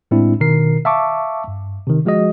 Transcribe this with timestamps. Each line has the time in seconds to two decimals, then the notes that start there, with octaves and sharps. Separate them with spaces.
0.11 A2 G#3 C4 D4 E4
0.40 B2 D#3 A#4 C7
0.85 E5 F5 A5 C#6 D6
1.48 G2
1.87 C3 D#3
2.05 F3 G#3 F#4 G#4 D#5